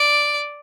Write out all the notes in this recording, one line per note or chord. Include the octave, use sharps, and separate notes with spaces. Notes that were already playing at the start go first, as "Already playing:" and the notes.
Already playing: D5